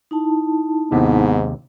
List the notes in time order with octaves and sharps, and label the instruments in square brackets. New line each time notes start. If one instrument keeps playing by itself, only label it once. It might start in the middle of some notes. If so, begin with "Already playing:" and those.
[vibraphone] D#4 E4 A5
[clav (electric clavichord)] D#2 C3 [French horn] G#2 [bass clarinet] B3